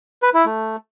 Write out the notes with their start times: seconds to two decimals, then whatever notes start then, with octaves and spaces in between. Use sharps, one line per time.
0.23 B4
0.34 E4
0.46 A3